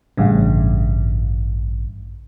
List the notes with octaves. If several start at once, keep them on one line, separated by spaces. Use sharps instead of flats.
A1 G2 C#3